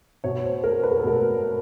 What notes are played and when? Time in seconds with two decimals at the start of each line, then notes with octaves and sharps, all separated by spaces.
0.24 B2 C#5
0.44 C5
0.64 A#4
0.83 B4
0.91 A#4
1.00 A4
1.04 B2 A#4